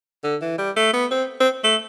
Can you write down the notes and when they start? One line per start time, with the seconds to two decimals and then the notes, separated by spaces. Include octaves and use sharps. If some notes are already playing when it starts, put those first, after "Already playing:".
0.24 D3
0.42 E3
0.58 G3
0.76 A3
0.93 B3
1.11 C4
1.41 C4
1.64 A3